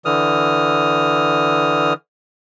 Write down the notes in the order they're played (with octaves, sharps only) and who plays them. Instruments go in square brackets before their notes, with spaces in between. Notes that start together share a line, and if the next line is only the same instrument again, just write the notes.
[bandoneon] D3 E3 D#6 F6